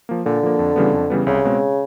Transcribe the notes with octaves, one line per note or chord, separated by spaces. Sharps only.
F3 A#3
A#2 D3
F3 A#3
F2
C#3 E3 G3 B3
F2
C#3 E3 G3 B3
C2 C#3
B2 G#3 C4